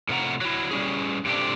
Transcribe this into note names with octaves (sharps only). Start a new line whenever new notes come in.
A2 C3 F4 F#5 A#5
F#3 E4
G3 C#4 G#4
G2 C3 A3 D4 F#4 G4